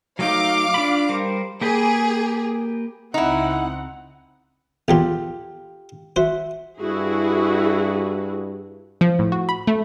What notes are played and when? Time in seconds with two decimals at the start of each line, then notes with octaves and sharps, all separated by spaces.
0.19 F#3 A3 D#4 F5 D6
0.74 D4 F4 B5
1.09 G3 A#4 C5
1.61 A#3 G4 G#4 B4
3.14 C#2 C4 D#4 E4 F#5
4.88 A#1 E2 F#3 F4 G4 A4
6.16 F#4 C5 E5
6.80 G2 E4 F#4 G#4
9.01 F3
9.19 A2
9.32 F#4
9.49 B5
9.67 A3